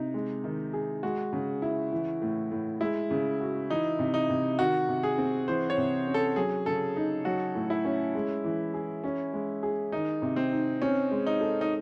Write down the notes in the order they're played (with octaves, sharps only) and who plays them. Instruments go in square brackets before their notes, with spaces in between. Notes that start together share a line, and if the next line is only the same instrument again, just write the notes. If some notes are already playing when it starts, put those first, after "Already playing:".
Already playing: [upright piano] C3 D#4
G#3
D#3
G#4
[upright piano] G#3 [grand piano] F#4
[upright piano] C#3
E4
E3
A2
A2
[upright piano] G#3 [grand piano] E4
[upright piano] C#3
F#4
[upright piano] E3 [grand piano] D#4
[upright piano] C3
[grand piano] D#4
[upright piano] C3
[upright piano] D#3 [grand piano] F#4
[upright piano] C3
[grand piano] G#4
[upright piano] C4
[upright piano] E3 [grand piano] C5
[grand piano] C#5
[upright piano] C3
C#4
[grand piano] A4
[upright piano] F#3 [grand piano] G#4
[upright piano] C#3 [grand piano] A4
[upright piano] D#4
[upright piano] F#3 [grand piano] F#4
[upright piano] A2
[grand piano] E4
[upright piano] C#4
G#3
E3
G#4
C#4
G#3
G#4
[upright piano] D#3 [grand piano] D#4
[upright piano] C3
[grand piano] C4
[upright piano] D#4
[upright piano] C4 [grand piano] C#4
[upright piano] G#3
[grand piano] D#4
[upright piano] A4
[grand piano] D#4